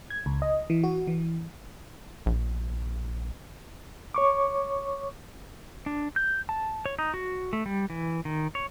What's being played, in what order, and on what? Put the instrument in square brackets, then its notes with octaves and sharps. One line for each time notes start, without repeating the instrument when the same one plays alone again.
[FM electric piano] G#6
C#2
D#5
E3
F#4
E3
[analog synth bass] A#1
[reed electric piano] C#5 C#6 D6
[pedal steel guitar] D4
G6
A5
C#5
D#4
F#4
A3
G3
E3
D#3
C#5